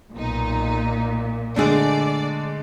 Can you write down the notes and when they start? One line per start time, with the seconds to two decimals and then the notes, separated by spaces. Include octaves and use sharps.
0.13 B1 A#2 D#4
1.56 D3 G#3 A3 D4 G#4 D5